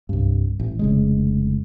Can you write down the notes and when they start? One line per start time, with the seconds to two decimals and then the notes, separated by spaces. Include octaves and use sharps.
0.09 C2 G2
0.60 A1
0.79 F1 C#3 G#3